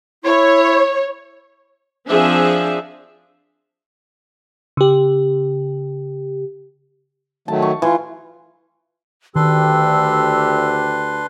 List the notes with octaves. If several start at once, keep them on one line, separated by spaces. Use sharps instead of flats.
E4 C#5
F3 C4 D4 G#4 E5
C#3 G4
D#3 F#3 A3 A5
C#6
E3 F4
D2 D#3 D4 G4 B4 C6 E6